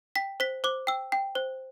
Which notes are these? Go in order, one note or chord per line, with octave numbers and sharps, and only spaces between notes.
G5 B6
C5 B6
C5 D6
G5 E6
G5
C5